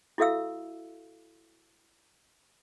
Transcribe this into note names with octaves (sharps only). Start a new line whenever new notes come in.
E4 F#4 A4 E5 F5 E6